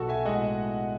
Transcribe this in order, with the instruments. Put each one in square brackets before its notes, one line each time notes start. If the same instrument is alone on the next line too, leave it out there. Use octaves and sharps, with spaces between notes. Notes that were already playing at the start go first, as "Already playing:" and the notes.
Already playing: [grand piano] B1 F#4 A4
E5 G#5
A2 G#3 D#5 F#5